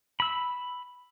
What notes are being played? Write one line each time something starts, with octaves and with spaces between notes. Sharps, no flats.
B5 E6